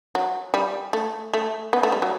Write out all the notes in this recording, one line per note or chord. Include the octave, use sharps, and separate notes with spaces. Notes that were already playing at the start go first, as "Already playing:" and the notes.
F#3
G3
A3
A3
B3
A3
G3
F#3